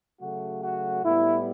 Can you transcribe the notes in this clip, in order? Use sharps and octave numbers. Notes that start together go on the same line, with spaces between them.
C#3 F#3 A3 F#4
F#4
A2 G3 B3 E4